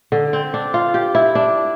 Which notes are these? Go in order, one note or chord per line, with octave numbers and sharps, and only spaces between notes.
D3
C4
D4
F4
G4
E4
D4